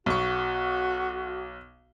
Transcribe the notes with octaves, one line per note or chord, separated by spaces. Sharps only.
B1 F#4 C#6